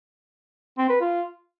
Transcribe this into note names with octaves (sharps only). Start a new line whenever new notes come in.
C4
B4
F4